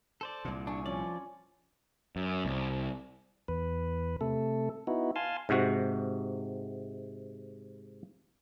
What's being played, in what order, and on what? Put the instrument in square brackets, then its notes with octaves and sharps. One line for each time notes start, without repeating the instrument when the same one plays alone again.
[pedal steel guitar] A4 C5 D5
[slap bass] C2 A#2
[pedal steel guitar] D4 [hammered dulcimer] G#5 C#6
[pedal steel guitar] F3 D5 [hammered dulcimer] C#4
[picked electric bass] F#2
C2
[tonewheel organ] E2 B4
C3 A3 A4
B3 D#4 E4 F#4
F5 G#5 A5 C6
[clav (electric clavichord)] G#2 C3 F#4